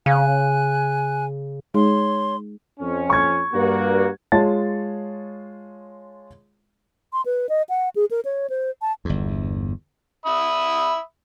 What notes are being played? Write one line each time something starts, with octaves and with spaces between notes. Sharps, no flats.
C#3 F5 G#5 F#6
G#3 D#4 G#4 C#5 C6
F2 C#4
C#6 G#6
G2 A#3 F#4
G#3 F4 C#5 A5 A6
C6
B4
D#5
F#5
G#4
A#4
C#5
C5
A5
G1 E2
E5 B5 D#6